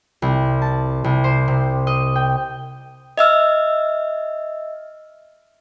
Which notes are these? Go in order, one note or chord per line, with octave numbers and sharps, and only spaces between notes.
C2
A5
C2
C5
C3
D#5
G5
D#5 E5 E6 F6